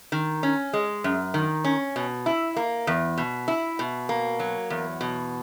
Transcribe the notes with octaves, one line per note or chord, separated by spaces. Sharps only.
D#3
C#4
G#3
F#2
D#3
C#4
B2
E4
A#3
E2
B2
E4
B2
A#3
F#3
E2
B2